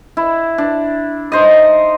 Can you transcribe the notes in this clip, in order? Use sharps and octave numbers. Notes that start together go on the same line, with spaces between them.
E4
D4
D#4 C5 D#5